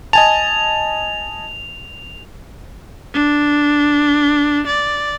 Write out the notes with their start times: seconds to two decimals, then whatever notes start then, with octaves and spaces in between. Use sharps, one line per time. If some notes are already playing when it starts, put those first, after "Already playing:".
0.13 D#5 G#5 A5 F7
3.14 D4
4.66 D5